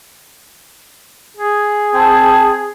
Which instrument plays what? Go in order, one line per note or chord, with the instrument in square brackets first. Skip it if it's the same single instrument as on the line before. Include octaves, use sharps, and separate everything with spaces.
[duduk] G#4
[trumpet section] C4 G5 A5